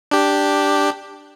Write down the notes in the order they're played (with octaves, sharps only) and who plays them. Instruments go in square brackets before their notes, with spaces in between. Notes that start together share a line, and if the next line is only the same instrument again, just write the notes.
[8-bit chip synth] D4 G4